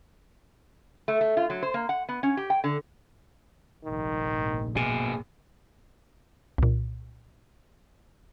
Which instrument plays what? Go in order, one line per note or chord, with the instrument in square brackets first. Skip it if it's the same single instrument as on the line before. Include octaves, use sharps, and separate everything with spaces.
[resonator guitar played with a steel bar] A3
A3
F4
F#3
C5
A#3
F#5
B3
C#4
G4
G5
D3
[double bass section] F1 A#1 G#2 [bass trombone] D#3
[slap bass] B2 [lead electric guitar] A#3 G#4
[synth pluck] C2 A#2